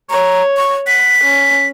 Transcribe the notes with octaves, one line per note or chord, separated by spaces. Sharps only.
C#5 A#5
C#6
F#5 B6
C#4